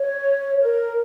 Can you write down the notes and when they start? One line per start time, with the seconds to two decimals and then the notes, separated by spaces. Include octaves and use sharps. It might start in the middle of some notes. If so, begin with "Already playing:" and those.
Already playing: C#5
0.60 A#4